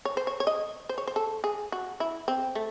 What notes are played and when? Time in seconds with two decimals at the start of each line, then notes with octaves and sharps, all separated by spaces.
0.05 C#5
0.17 C5
0.27 C#5
0.40 C#5
0.47 D#5
0.89 C5
0.98 C#5
1.07 C5
1.16 A4
1.44 G#4
1.72 F#4
2.00 E4
2.28 C4
2.55 A3